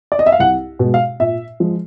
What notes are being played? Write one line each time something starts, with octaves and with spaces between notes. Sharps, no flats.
D5
D#5
E5
F5
C2 F#5
B2 G#3
F5
A#2 E5
F3 G#3